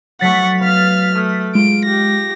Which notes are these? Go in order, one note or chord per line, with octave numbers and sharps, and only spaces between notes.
F#3 A3 F#5 C#6 A6 B6
B3 F5 F6
A3 D#6 F6 G#6
G#3 F4 D7
G4 A#6